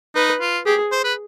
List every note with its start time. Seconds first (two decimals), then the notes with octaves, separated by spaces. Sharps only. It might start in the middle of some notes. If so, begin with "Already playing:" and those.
0.15 D#4 B4
0.41 F4
0.66 G4 G#4
0.92 C5
1.04 B4